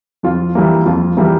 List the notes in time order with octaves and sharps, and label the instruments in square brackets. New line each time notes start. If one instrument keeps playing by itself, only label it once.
[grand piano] F2 F4
E3 G3 A#3
F2 F4
E3 G3 A#3